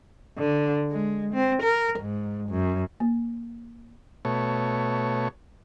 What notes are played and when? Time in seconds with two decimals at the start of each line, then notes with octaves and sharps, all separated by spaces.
0.38 D3
0.91 G#3
1.34 C4
1.63 A#4
1.99 G#2
2.50 F#2
3.00 A#3
4.25 B2 A3 C#5